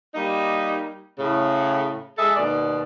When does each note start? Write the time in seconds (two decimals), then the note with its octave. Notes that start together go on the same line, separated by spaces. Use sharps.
0.15 G3 A#3 D#4
1.19 A2 C#3
2.17 G#3 G#4 A4 E5
2.36 D#2 B2 D5